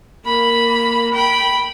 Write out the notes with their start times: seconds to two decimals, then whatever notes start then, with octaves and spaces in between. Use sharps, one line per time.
0.25 A#3 B5
1.14 G5 B5